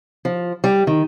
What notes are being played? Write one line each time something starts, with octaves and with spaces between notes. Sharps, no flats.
F3
G3
D#3